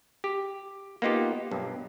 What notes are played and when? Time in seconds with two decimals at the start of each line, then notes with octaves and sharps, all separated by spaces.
0.24 G4
1.02 A#3 B3 D#4 F4 G4
1.51 B1 G2